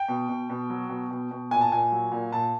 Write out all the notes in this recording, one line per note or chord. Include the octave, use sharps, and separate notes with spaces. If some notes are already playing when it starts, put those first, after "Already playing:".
Already playing: G5
B2
B2
B2
F#3
B2
B2
B2
A#2 G#5
A5
A#2 G#5
F#3
A#2
A#2 A5